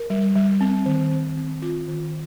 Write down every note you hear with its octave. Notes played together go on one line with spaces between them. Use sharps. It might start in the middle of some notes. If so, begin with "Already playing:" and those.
Already playing: A#4
G3
G3
C4
D#3
C4
C4
F4
D#3